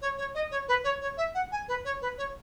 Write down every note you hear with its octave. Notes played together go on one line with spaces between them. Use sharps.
C#5
C#5
D#5
C#5
B4
C#5
C#5
E5
F#5
G#5
B4
C#5
B4
C#5